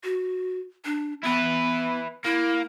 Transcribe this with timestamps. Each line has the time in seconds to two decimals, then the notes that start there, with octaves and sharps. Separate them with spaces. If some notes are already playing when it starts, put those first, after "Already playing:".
0.04 F#4
0.85 D4
1.23 B3 E4 B4
2.25 A#3 E4